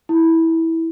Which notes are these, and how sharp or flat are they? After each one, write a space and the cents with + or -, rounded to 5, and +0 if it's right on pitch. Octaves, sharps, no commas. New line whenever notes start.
E4 -15